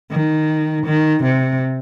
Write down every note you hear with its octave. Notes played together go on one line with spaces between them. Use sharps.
D#3
D#3
C3